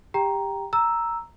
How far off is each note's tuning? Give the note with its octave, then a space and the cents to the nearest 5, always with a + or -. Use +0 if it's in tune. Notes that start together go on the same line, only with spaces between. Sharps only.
G4 +20 G5 -5 A#5 +5
A#5 +0 E6 +0